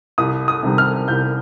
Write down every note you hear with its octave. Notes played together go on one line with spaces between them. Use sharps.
C2 D#6
D#6
C3 D#3 G3
F6
C2 G6